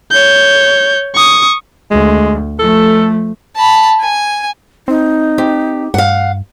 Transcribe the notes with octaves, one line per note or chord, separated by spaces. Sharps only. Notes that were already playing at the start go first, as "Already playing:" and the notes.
C#5 G6
C#6 D#6
D2 G#3
F3 A3 A4
A5 B5
G#5
C4 D#4
C4 G4
G2 F5 F#5